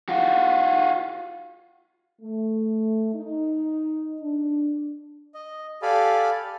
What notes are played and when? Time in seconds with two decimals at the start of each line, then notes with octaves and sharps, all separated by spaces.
0.09 F4 F#4
2.21 A3
3.15 D#4
4.21 D4
5.34 D#5
5.82 G4 A4 D5 F5 G#5 B5